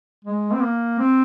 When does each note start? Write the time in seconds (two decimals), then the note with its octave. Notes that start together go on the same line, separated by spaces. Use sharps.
0.25 G#3
0.53 C4
0.61 A#3
0.99 C4